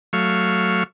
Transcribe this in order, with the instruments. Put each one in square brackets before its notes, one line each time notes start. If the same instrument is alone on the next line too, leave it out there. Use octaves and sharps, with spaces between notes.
[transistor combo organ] F#3 A3 F5 C#6